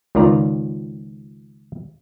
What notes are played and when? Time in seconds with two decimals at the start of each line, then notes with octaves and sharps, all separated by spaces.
0.15 C#2 D#3 F4 D5 A#5